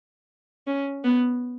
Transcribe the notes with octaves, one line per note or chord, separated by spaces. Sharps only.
C#4
B3